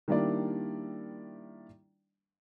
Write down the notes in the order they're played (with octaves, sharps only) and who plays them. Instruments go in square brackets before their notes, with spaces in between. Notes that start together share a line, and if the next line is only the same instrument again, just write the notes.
[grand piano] D#3 G3 A#3 D4 E4 D5